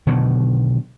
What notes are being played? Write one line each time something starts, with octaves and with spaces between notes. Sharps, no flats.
B2 D3 D#3 F#3